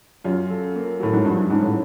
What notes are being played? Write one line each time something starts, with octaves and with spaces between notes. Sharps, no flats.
F#2 F4
A4
A#3
A2 F#3
G#2
G2 F3
G2
G#2 C#4
A2